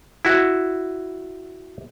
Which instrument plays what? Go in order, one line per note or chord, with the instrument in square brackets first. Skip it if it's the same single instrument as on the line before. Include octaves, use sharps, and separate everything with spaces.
[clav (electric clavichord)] E4 F#4